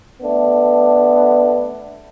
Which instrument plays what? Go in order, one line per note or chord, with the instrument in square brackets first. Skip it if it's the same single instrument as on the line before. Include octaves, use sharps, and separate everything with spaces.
[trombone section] A3 B3 D4